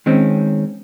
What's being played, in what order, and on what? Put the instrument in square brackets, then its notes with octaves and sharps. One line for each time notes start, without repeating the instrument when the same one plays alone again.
[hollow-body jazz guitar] D#3 G#3 C4 C#4